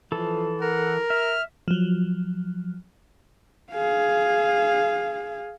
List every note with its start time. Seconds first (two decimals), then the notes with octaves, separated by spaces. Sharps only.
0.12 E3 F3 A4
0.61 A#4 F#5
1.10 E5 F6
1.68 F3 F#3
3.72 G#4 F5